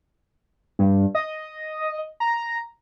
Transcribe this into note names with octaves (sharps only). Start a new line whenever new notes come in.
G2
D#5
A#5